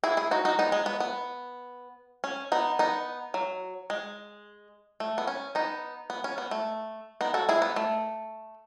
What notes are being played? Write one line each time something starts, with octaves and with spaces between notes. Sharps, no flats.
E4 G#4
E4 G#4
D#4 F#4
D#4 F#4
B3 D#4
G#3
B3
B3
C#4
B3 D#4
B3 D#4
F#3
G#3
A3
B3
C#4
B3 D#4
B3
C#4
B3
A3
B3 D#4
F#4 A4
E4 G#4
B3
A3